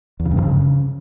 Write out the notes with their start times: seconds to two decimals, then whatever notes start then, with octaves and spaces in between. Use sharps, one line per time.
0.20 E2
0.25 C#3
0.31 G2
0.37 F2
0.43 C#3